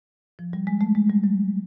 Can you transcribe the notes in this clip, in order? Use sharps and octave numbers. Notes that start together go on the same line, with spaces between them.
F3
G3
G#3
A3
G#3
G3
F#3